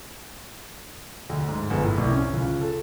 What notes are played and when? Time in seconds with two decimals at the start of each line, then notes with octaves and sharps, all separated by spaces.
1.29 D2
1.49 G#2
1.70 G1
1.83 A2
1.98 C2
2.12 C#4
2.33 C#2
2.61 A4